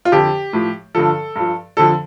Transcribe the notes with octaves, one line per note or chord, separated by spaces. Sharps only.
F4
F2 D3 F3 G4
A2 F3
G2 D3 F3 A4
G2 F3
F2 D3 F3 A4